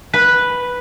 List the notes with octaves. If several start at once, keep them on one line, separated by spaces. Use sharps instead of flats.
B4